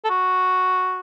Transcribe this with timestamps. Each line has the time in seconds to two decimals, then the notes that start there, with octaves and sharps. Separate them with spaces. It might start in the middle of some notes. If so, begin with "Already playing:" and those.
0.05 A4
0.10 F#4